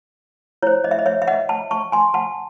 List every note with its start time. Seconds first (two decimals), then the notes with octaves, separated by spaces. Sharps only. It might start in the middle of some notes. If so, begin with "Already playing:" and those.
0.62 E4 C5 C#5
0.84 D#5
0.91 E5
0.99 D#5
1.06 C#5 E5
1.22 E5
1.28 D#5 F#5
1.49 F#5 A5
1.71 A5 C#6
1.92 G#5 C6
2.14 F#5 A5